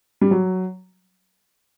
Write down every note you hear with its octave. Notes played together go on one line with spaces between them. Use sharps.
G3
F#3